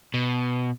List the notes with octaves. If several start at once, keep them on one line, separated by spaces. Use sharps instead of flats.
B2